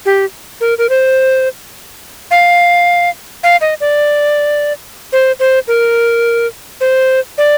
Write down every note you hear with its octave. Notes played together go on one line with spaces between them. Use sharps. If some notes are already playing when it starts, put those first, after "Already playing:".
G4
A#4
A#4
C5
F5
F5
D#5
D5
C5
C5
A#4
C5
D5